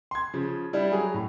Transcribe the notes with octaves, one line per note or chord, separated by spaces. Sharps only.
C6 G#6
C#3 F3
G3 D4 E4
F#3 G#4
A2